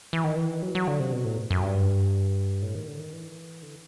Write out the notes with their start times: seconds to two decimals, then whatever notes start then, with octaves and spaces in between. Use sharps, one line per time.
0.13 E3
0.24 D#3
0.36 E3
0.62 F#3
0.75 F#3
0.88 D3
1.00 C3
1.13 B2
1.25 A2
1.51 F#2
1.63 G2
2.62 A2
2.75 D#3
2.88 D3
3.00 D#3
3.13 E3
3.63 D3